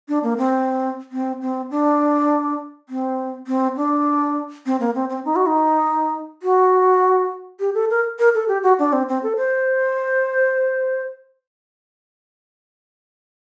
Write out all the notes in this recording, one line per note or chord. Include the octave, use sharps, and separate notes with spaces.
D4
A#3
C4
C4
C4
D4
C4
C4
D4
C4
A#3
C4
C4
D#4
F#4
D#4
F#4
G4
A4
A#4
A#4
A4
G4
F#4
D4
C4
C4
A4
C5